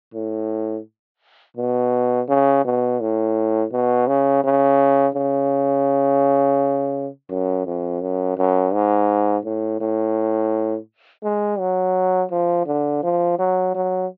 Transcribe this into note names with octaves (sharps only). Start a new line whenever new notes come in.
A2
B2
C#3
B2
A2
B2
C#3
C#3
C#3
F#2
F2
F#2
F#2
G#2
A2
A2
G#3
F#3
F3
D3
F3
F#3
F#3